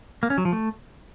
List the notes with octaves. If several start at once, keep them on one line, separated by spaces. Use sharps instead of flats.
A#3
C#4
F#3
F3
A3